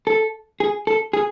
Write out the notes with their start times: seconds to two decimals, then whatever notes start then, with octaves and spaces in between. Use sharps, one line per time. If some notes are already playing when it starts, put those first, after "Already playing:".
0.07 A4
0.60 G#4
0.87 A4
1.13 G#4